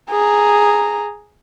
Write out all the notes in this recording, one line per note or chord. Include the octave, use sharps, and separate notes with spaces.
G#4 A#5